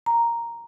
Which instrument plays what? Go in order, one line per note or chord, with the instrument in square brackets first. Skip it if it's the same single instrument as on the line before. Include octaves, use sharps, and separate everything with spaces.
[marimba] A#5